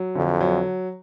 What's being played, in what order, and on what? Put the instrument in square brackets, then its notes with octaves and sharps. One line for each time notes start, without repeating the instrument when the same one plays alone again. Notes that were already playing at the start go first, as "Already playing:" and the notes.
Already playing: [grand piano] F#3
[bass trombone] F2 [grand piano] D3
[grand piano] F#3